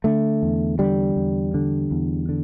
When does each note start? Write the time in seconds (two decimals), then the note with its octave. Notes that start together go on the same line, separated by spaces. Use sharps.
0.04 D3 A3
0.43 E2
0.79 D3 G3
1.16 E2
1.54 D3
1.91 E2
2.29 D3